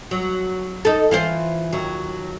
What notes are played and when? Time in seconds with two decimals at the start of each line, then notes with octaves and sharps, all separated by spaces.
0.11 F#3
0.85 D#4 A4
1.11 E3 F4 C5
1.73 D#2 F#3